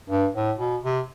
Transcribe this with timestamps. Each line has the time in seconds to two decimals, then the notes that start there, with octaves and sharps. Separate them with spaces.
0.10 G2
0.34 A2
0.59 B2
0.83 C3